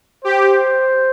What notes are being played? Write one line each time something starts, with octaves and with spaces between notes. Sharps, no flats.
G4 C5